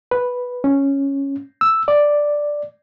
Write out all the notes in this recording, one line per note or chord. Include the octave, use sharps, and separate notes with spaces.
B4
C#4
E6
D5